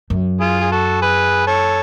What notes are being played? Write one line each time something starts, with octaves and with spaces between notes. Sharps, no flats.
F#2
F4 G#4
G#4
F#4 A4
G#4 B4
A4 C#5